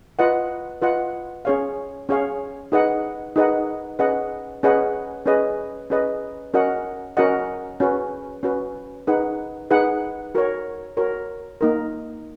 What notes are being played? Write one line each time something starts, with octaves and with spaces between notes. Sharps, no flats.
F4 B4 D#5 F#5
F4 B4 D#5 F#5
C#4 G#4 C#5 F5
C#4 G#4 C#5 F5
D#4 G#4 B4 D#5 F#5
D#4 G#4 B4 D#5 F#5
C#4 G#4 B4 D#5 F#5
C#4 G#4 B4 D#5 F#5
C#4 G#4 B4 D#5
C#4 G#4 B4 D#5
C#4 F#4 A#4 D#5 F#5
C#4 F#4 A#4 D#5 F#5
C#4 F#4 B4
C#4 F#4 B4
D#4 G#4 B4 F#5
D#4 G#4 B4 F#5
F#4 A#4 C#5
F#4 A#4 C#5
A#3 D#4 A#4